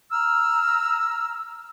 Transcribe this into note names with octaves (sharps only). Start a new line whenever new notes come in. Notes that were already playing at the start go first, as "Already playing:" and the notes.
A#5 E6 F6